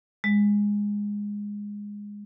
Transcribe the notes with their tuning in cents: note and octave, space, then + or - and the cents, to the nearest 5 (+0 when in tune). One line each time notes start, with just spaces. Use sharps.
G#3 -15